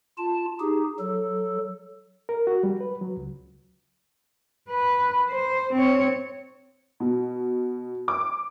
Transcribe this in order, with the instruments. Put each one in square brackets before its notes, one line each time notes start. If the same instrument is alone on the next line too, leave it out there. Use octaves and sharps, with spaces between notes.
[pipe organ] F4 A5
D#4 G4 G#4
F#3 A4
[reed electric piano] A#4
F#4
G3
B4
F#3
C#2
[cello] B4
C5
C4 C#5
[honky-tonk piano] B2
D6